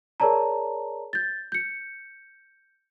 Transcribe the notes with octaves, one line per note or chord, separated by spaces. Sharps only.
G#4 A#4 C#5 D5 A5 A#5
G6 A6
G6 C#7